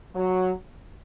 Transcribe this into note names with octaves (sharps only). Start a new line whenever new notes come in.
F#3